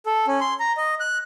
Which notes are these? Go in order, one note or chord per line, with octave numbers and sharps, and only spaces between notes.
A4
C#4
C6
A#5
D#5
F#6